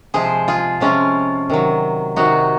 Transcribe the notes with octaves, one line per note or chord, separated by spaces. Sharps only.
C3 F3 G#3 G#4 C5
F4 G#4
C3 F3 G#3 C#4 F4
C3 D#3 F#3
C3 D#3 F#3 D#4 F#4